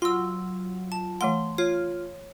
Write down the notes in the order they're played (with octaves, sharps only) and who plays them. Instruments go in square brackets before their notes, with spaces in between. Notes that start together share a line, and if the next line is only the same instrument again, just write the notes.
[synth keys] F#3 F4 [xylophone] C6 E6
[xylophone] A5
[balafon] E3 A3 F#5 [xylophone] C6
[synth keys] F4 [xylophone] C#5